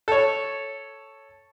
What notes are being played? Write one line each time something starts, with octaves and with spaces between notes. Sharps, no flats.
A4 C#5